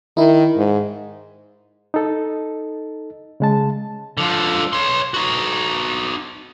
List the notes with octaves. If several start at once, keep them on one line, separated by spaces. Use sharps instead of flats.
D#3 D#4 E4
G#2
D#4 A4 D#5
C#3 G#3 A5
D3 F3
C#5 C6
D#4 F#4